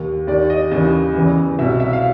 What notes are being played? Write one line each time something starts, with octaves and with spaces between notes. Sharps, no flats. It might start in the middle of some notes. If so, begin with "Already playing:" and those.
Already playing: D#2 D#3
D#2 D#3 D5
D#5
D#2 C#3 E3
E2 C#3 E3
C2 B2 E5
E5
F5